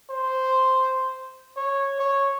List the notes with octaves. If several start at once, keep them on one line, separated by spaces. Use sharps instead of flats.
C5
C#5
C#5